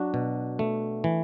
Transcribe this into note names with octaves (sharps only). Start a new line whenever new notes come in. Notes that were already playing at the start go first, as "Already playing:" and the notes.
Already playing: F#3 D4 F#4
B2
A3
E3